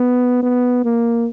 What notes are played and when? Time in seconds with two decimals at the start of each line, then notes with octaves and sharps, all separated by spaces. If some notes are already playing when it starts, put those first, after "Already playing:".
Already playing: B3
0.43 B3
0.85 A#3